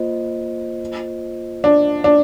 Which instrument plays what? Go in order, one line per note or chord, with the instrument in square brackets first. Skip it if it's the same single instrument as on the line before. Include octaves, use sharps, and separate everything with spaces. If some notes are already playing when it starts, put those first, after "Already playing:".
Already playing: [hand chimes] A#3 F4 C5 D#5
[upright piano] D4
D4